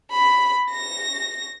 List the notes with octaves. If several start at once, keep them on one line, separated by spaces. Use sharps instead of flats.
B5
A#6